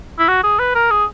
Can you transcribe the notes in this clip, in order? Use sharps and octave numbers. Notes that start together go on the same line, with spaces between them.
E4
F#4
G#4
B4
A#4
G#4